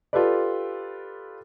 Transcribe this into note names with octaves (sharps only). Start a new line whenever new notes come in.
F4 G4 A4 B4 D5